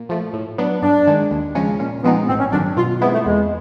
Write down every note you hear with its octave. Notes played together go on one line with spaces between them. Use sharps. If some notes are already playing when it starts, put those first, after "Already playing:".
Already playing: A#2
F3 A3
A2
F#3 B3 D4
G2 D4
D#3 G#3
D#2
C#3 F3 G#3 C#4
A#2 C#4
F3 G#3 B3 C4 D#4
A1 C4
C#4
G2 D#3 F#3 D4
B2 F4
G#3 B3 C4 E4
A3
E2 G#3